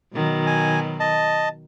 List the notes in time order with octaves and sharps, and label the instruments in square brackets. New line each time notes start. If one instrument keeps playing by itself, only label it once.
[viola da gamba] B2 D#3 F#3
[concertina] G#5
D#5 A5